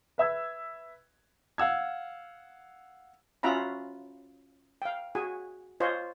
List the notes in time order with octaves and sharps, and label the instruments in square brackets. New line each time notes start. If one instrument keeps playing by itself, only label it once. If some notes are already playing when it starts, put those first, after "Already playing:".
[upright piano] B4 E5 E6 G#6
[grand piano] F5 F#5 E6 G#6
[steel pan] C#4 F4 F#4 E5 A#5 B5
F5 G5
F#4 G#4 G#5
F4 C5 C#5 D#5